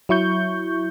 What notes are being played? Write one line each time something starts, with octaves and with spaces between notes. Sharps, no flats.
F#3 E4 C#6 G6